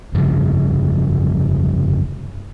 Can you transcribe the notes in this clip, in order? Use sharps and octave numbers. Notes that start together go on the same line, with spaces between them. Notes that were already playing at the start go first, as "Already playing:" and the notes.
F1 G2 C#3 F3